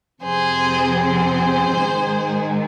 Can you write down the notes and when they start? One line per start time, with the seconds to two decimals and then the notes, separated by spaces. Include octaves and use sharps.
0.23 F2 C3 F3 C4 G#4 C5
1.00 G#4 C5
1.77 G#2 D#3 G#3